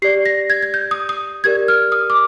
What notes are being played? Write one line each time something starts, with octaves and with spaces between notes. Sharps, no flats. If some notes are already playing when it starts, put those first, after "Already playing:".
G4 D5 C7
A#6
G#6
G#6
G6
D#6
D#6
G4 A#4 D5 G#6
F6
D#6
D6